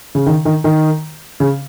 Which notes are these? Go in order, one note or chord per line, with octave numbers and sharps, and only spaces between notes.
C#3
D#3
D#3
D#3
C#3